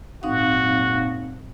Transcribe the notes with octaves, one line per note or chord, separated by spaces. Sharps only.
G#1 F#2 A#2 C4 D#4 F#4 F5